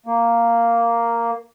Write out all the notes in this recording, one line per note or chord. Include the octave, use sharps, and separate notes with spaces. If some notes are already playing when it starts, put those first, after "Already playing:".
A#3